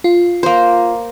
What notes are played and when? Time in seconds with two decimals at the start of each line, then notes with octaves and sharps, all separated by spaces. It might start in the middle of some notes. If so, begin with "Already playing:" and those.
0.04 F4
0.43 A#3 C5